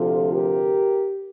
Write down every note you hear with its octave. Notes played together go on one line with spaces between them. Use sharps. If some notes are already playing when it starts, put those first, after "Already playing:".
Already playing: D2 C3 F3 F4 A4
G4 A#4